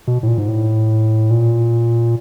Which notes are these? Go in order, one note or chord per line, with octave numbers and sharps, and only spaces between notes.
B2
A2
A#2
G#2
A2
A#2